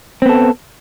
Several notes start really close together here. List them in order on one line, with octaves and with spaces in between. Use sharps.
C4 B3 A4